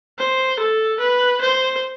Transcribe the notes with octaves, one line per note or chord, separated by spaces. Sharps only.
C5
A4
B4
C5